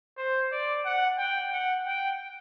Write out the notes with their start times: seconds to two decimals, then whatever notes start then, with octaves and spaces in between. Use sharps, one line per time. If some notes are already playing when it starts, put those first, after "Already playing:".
0.17 C5
0.52 D5
0.86 F#5
1.19 G5
1.52 F#5
1.87 G5